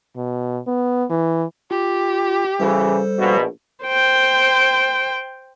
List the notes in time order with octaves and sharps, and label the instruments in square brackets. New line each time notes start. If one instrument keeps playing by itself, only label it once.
[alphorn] B2
B3
E3
[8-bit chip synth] F4 [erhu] G4
[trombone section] C#3 E3 [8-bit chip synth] G3 A4 C5
[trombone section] A#1 B2
[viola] C5 G5